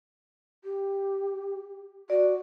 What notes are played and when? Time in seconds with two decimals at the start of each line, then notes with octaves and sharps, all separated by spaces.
0.64 G4
2.10 F#4 D5